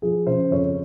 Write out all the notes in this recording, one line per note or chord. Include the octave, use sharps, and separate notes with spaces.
F3 G#4
C#3 C5
F2 C#5